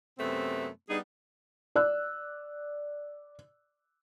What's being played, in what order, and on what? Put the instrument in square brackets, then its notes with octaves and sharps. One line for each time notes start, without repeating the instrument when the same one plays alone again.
[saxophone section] F#2 C3 A3 B3 C4
G3 B3 D4 D#4 G#4
[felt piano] D5 E6 F#6